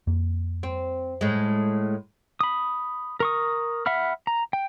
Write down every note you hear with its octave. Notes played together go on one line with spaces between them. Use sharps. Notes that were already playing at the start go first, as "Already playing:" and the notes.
F2 A#3
C4
A2 G#3
B5 D#6
A#4 C#6 D#6
E5 F#5 B5 F6
A#5
G5